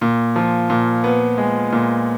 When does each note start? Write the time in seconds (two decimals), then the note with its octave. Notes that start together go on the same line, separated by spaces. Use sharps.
0.01 A#2
0.36 F3
0.70 A#2
1.04 B3
1.38 G#3
1.72 A#2